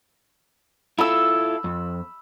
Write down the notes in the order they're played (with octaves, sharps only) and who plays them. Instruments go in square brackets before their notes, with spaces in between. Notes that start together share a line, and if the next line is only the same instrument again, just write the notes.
[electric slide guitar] E4 F4 A4 [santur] B5 E6
[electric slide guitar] F2